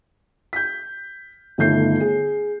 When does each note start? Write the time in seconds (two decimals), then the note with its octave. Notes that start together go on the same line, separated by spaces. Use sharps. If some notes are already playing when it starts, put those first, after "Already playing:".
0.53 G6 B6
1.58 G1 D#3 A3 G6 C7
2.00 G#4